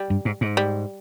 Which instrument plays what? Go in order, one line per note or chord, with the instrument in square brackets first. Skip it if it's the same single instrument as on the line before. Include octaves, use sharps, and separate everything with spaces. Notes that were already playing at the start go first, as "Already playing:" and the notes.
Already playing: [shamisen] G3
[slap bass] G2
G#2
G#2
[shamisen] G3